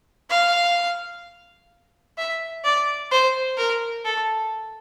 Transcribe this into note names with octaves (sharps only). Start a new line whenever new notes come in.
F5
E5
D5
C5
A#4
A4